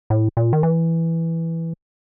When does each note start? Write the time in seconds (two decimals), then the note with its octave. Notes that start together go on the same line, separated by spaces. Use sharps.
0.10 A2
0.37 A#2
0.53 D#3
0.63 E3